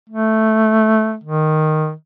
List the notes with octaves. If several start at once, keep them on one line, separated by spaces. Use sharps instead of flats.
A3
D#3